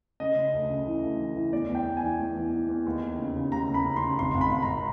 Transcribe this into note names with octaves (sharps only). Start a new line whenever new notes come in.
C#3 D#5
C#3
D2
C#3
E3
D2
E3
E3
E2 D5
E2
G5
E2
G#5
E3
E2
E3
E3
E2
D#2
D#2
C#3
C#3
D#2 A#5
C#3
B5
C#3
C6
C#3
G#1 C6
G#1
B5
G#1
A#5